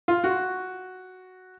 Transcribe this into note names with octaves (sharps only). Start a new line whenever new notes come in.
F4
F#4